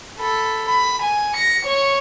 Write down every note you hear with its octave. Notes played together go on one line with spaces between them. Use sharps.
A4 B5
B5
G#5
A#6 C#7
C#5 C#6